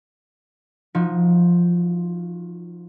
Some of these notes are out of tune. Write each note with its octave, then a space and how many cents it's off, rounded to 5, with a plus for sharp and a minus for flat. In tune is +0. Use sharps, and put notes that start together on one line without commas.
F3 +0 D#4 +0 F#4 -25